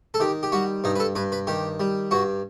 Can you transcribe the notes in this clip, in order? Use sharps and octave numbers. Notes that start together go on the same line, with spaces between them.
A4
D#3 G4
G4
G3 F#4
G2 D#4
B4
A4
G2 B4
B4
D#3 G4
G3
G2 F#4